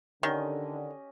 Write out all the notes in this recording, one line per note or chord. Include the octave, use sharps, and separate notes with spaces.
D3 D#3 C#4 G4 D#5